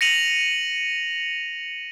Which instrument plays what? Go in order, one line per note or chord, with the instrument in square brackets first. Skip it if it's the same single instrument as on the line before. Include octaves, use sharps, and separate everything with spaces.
[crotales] A#6 C#7 D#7 F7 F#7